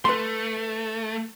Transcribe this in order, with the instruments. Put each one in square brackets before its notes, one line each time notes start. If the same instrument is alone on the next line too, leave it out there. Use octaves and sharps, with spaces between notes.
[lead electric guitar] A3 [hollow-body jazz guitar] B4 C6